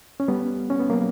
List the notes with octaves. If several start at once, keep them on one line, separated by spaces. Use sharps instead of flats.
C#4
G3 B3
C#4
B3
F#3 A#3